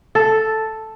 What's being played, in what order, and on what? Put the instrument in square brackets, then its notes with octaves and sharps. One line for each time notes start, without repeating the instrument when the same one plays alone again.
[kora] A4